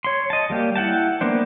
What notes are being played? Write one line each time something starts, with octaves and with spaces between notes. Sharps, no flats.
C#5 C6
D#5 A5
G3 A#3 G4
E4 F#5 G5 A5
A#3 B3 D4 C5